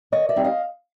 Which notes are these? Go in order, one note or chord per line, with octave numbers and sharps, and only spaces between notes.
D#3 C#5 D#5
D5 E5
G3 C4 D#4
D#5 F5